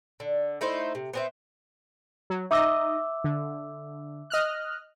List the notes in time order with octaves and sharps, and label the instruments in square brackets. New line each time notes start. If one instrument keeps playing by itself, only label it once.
[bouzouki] D3
A3 D#4 E4 C5
C3
B3 C4 E5
[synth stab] F#3
[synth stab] D#4 D#5 [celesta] E5 D6 E6
[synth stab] D3
D#5 F6 F#6